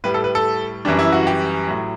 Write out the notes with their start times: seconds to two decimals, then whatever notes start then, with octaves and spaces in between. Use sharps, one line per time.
0.04 A2 G3 B4
0.14 A4
0.24 B4
0.35 A4
0.85 F#2 E3 G3 D4
0.99 E4
1.12 F#4
1.27 G4
1.67 A2 F#3